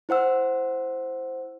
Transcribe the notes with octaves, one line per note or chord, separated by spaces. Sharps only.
E4 C5 F#5 E6